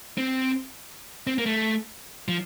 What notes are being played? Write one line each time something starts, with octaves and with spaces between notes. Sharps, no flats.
C4
C4
A#3
A3
F3